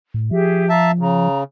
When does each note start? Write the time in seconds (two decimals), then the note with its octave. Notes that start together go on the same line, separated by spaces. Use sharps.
0.14 A2
0.31 F3 G4 G#4 E5
0.69 E5 F5 A5 A#5
0.99 C#3 A#5